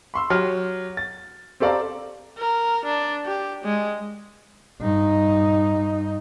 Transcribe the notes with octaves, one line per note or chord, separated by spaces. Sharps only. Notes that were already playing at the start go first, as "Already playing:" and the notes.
B5 C6 E6
F#3 G4 F6
A6
C4 G4 A4 D5 F5 A#5
A#4
D4
G4
G#3
G2 D#4